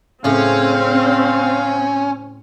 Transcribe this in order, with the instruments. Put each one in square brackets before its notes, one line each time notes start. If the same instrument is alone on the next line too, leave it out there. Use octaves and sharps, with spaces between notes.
[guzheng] A2 C#3 [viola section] C4 [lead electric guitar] C#4 [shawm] F5